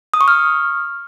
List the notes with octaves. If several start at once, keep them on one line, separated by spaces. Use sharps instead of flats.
D#6
C#6
F6